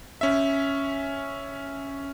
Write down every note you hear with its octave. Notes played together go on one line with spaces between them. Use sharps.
C#4 E5